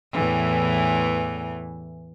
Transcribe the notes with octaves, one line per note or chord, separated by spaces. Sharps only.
E2 A2 E3